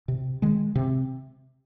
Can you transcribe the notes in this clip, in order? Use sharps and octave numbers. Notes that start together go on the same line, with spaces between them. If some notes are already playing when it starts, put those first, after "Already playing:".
C3
D#3 G#3
C3